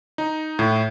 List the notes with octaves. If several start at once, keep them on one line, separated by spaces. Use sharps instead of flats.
D#4
A2